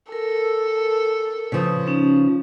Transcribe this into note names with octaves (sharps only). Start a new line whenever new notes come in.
A4 A#4
C#3 F3 B4 D#6
C#4 D#4